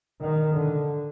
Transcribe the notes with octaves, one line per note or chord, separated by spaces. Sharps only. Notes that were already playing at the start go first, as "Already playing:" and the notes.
D#3
D3